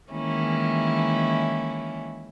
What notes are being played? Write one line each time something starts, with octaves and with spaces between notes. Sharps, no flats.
D#3 E3 G#3 A#3 C#4 E4